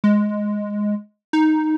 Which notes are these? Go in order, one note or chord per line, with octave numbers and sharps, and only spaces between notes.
G#3
D#4